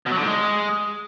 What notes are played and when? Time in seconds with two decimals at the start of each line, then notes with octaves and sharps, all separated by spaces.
0.06 B2
0.11 F#3
0.17 D3
0.22 G#2
0.28 G#3